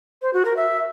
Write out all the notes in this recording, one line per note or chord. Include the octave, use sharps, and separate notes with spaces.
C5
F#4
A#4
E5